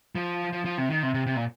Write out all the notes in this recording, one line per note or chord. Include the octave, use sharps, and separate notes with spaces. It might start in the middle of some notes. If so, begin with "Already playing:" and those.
F3
F3
F3
C3
D#3
C3
C3
C3
A#2